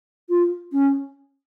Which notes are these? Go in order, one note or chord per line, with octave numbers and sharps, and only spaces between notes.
F4
C#4